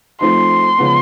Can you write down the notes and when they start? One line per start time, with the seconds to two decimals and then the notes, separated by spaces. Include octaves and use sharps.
0.21 F3 A3 C4 D#4 C6
0.78 C#3 F3 G#3 B3